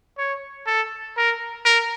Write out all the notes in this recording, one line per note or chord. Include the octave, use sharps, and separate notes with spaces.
C#5
A4
A#4
A#4